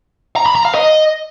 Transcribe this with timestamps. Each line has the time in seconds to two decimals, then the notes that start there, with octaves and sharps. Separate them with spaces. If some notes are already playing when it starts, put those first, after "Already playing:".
0.36 A#5
0.46 B5
0.55 A#5
0.65 F5
0.75 D#5